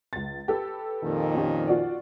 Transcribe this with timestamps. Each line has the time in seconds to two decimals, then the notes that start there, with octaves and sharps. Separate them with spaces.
0.13 C#2 A6
0.48 G4 A4 B4
1.04 F2 A#2 D#3
1.34 C#4 G4
1.67 F4 F#4 D5